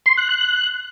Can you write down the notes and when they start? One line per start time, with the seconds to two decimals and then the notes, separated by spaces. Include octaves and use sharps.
0.06 C6
0.17 F#6
0.29 F#6